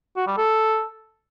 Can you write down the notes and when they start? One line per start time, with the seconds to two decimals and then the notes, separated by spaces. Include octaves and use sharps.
0.17 F#4
0.27 G3
0.37 A4